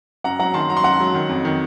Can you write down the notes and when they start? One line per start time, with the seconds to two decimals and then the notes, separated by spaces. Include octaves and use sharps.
0.24 F#2 F#5 A#5
0.39 F#3 F#5 A#5
0.54 D#3 A5 C6
0.70 F#3 A#5
0.77 C6
0.84 F#2 F#5 A#5
1.00 F#3
1.14 D#3
1.29 F2
1.45 D#3